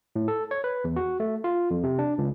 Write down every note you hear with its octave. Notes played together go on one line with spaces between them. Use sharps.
A2
A4
C#5
B4
E2
F#4
A3
F4
F2
C3
D4
C#2